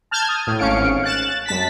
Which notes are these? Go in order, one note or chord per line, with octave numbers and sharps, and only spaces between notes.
A5 F6 G6 G#6
D#6
A2
G#1 C#4 F5 C#7 D7
F#6 A6 E7
F#2 A5 A6 B6